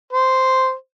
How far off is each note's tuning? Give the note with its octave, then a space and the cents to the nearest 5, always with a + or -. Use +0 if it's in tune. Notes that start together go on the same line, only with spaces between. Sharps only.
C5 -5